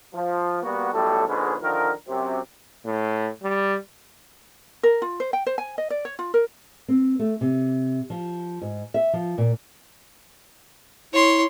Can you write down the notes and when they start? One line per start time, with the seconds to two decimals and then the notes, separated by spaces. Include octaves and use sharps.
0.14 F3
0.63 G3 A#3 B3 F#4
0.93 B1 A2 G3 A4
1.28 A#1 G#2 D3 G#3 C#4 B4
1.62 D3 D#3 F3 A#4
2.08 F#2 C3 C4
2.86 A2
3.43 G3
4.83 A#4
5.02 F4
5.20 C5
5.33 G5
5.46 C5
5.58 G#5
5.78 D#5
5.90 D5
6.05 C#5
6.19 F4
6.34 A#4
6.88 C4
7.19 A3
7.41 C3
8.10 F3
8.62 G#2
8.94 E5
9.13 F3
9.38 A#2
11.13 E4 C#5 C6